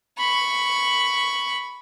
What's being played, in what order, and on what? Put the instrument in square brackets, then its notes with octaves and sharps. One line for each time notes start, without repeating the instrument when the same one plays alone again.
[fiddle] B5 C#6